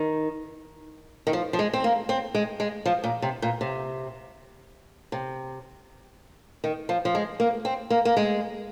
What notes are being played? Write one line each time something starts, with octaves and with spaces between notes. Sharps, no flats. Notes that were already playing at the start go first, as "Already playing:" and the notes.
Already playing: D#3
D#3
F3
F3
G#3
C4
A#3
C4
G#3
G#3
F3
A#2
C3
A#2
C3
C3
D#3
F3
F3
G#3
A#3
C4
A#3
A#3
G#3